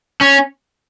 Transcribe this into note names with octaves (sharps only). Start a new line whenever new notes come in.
C#4